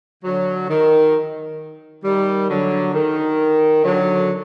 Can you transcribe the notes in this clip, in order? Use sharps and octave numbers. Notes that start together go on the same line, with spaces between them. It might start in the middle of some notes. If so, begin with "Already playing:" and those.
D3 F#3
D#3
D#3 G3
D3 F#3
D#3
D3 F#3